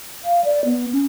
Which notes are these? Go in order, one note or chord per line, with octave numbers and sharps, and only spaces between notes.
F5
D5
B3
C#4